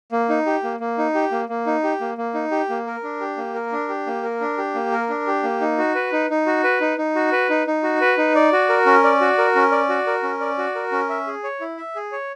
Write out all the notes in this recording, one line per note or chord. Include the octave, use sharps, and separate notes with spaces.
A#3
D#4
G4
A#3
A#3
D#4
G4
A#3
A#3
D#4
G4
A#3
A#3
D#4
G4
A#3
A#4
D4
G4
A#3
A#4
D4
G4
A#3
A#4
D4
G4
A#3
A#4
D4
G4
A#3
D#4
F#4
B4
D#4
D#4
F#4
B4
D#4
D#4
F#4
B4
D#4
D#4
F#4
B4
D#4
D5
F#4
A#4
C#4
D5
F#4
A#4
C#4
D5
F#4
A#4
C#4
D5
F#4
A#4
C#4
E5
G#4
C#5
E4
E5
G#4
C#5